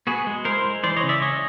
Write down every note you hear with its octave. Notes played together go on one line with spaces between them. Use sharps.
B3 F#4 G#4
G#3
E4 A#4 C5
G#3
E3 C5 D5
C#5 D#5
C#3
D5 E5
G#3 C#5 D#5